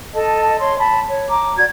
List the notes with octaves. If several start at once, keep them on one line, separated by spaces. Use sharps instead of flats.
A4 D#5 A5
C#5 C6
A5 B5
C#5
A#5 D6
F#4 D5 G#6